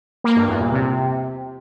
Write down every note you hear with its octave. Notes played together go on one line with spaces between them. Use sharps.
A#3
G2
E2
A#2
C3